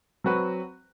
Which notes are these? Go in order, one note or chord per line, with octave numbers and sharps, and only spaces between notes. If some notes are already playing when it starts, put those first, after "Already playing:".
F#3 C4 F#4 B4